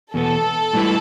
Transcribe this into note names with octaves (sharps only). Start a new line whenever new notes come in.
E2 B2 B3 A4
A2 G3 E4 B4